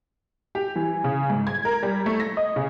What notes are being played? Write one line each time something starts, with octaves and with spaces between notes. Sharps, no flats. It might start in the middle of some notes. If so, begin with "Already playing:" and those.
G4
E3
C#3
G#2
G#6
A#4
G3
A3
A#6
D#5
C#3